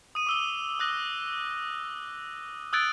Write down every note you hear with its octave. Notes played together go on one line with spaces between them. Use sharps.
D#6 D#7
D6 E6 G7
D#6 F#6 A#6
D#6 E6 F#6 G#6 A6 D7